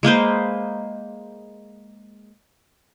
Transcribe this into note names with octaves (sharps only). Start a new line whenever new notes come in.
G#3 A#3 B4 C5